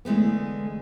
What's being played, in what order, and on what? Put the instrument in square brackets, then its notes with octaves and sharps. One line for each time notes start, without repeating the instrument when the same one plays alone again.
[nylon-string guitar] D3 E3 G#3 A3 B3